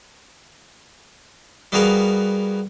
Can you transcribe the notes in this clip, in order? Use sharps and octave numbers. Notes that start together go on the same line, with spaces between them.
G3 B3 F#4 G#4 A#4 F5